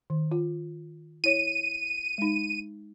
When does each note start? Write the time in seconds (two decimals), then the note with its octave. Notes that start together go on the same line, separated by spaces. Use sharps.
0.10 D#3
0.31 F4
1.24 E4 C#5 D#7
2.18 G#3 D#4